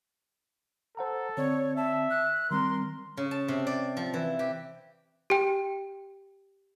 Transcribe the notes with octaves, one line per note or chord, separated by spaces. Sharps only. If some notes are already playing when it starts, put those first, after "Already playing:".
A4 C5 F#5 A#5
D3 C4 C#5 D5
E5 A5
F#6
D#3 G3 C4 A#4 C6
C#3
A5
C3
D5
F3
E3
G4
G4 G5